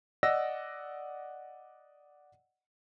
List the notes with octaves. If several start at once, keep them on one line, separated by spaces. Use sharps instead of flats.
D5 D#5 F#5 E6 A#6